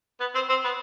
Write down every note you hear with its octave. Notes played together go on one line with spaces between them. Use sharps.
B3 B4
C4 C5
C4 C5
B3 B4